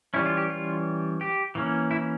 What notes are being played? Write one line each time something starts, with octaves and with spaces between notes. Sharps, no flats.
E3 G3 C#4 E4
F4
G4
F4
G4
E3 A#3 C#4
E4